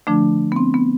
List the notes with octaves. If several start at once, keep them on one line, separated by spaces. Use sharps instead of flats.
D3 F3 A3 D4
B3
C4
B3